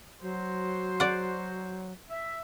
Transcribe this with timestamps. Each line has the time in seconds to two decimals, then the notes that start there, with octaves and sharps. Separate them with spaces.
0.22 F#3 F#4 C5
1.00 D5 F#5
2.10 E5